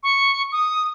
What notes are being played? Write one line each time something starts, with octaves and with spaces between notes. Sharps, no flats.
C#6
D#6